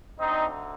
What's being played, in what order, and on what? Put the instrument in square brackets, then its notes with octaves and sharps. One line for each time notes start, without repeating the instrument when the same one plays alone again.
[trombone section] D2 D3 C4 D#4